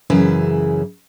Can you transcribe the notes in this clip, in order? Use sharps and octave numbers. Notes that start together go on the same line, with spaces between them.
F#2 C#3 E3 E4 G#4